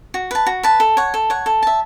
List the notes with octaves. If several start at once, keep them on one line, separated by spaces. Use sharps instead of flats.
F#4
B4 A5
F#4
B4 A5
A4
C#5 F#5
A4
C#5 F#5
A4
E5 A5